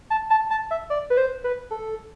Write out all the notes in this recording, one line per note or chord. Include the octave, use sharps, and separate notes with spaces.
A5
A5
A5
E5
D5
B4
C5
B4
A4